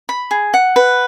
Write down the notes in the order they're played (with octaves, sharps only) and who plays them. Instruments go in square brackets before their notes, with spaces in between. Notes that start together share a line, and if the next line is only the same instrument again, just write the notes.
[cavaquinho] B5
G#4
F#5
B4